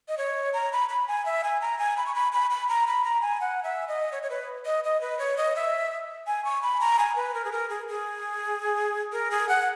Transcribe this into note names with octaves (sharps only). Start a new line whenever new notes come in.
D#5
C#5
A#5
B5
B5
G#5
E5
G#5
A#5
G#5
B5
C#6
B5
B5
B5
A#5
B5
A#5
G#5
F#5
E5
D#5
C#5
C#5
B4
D#5
D#5
B4
C#5
D#5
E5
G#5
C#6
B5
A#5
G#5
B4
A#4
G#4
A#4
G#4
G#4
A#4
G#4
F#5